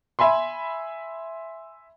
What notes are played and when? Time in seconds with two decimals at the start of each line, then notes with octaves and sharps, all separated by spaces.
0.19 E5 G#5 B5 C6